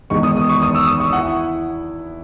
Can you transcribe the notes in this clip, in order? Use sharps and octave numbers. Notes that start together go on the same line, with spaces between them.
E2 D#3 G#3 B3 D#4 C#6
D#6
D#6
C#6
D#6
E6
D#6
C#6
E4 F#5